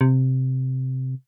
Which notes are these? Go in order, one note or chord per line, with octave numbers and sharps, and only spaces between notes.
C3